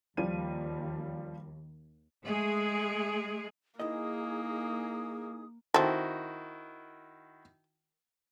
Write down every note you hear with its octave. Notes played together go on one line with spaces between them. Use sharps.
D#2 F3 G3 D#7
G#3 A3 G#4
A#3 D#4 E4 G#4 A#4 D#5 D#6
D#3 C4 E4 F#4 A4